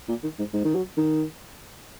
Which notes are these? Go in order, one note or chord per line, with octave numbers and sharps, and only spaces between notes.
A#2
D#3
G#2
G#2
D#3
F#3
D#3